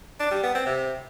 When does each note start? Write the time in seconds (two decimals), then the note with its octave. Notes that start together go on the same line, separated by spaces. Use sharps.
0.20 D4
0.31 G3
0.43 B3
0.54 C4
0.66 C3